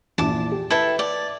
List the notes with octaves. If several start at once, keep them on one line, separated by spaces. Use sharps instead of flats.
A#1 E2 A5 D6
G4
E4 A4 B4 E5 G5 A5
D5